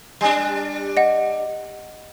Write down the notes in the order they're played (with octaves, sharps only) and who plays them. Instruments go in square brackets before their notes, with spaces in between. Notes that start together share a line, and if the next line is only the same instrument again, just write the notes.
[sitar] G3 D4
[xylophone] D#5 F#5